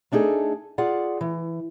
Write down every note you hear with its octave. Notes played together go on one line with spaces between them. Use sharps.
A3 D4 D#4 F#4 G#4 A4
F4 G#4 D5 F#5
E3